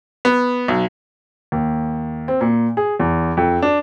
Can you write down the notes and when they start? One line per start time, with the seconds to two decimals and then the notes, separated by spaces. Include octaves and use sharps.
0.25 B3
0.68 B1
1.52 D#2
2.28 C4
2.41 A#2
2.77 G#4
3.00 E2
3.37 F2
3.62 D4